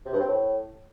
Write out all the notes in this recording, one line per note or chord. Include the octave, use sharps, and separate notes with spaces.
C3
G2
C4
A2